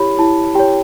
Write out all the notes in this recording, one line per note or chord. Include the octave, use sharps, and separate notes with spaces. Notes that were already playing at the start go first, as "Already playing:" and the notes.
Already playing: E4 G4 C#5 B5
E4 A5
G4 C#5 G5